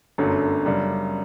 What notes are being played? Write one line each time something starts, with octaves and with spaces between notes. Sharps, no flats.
G1 F#2 D3 F#3 A3
F#2 C#3 G3 D4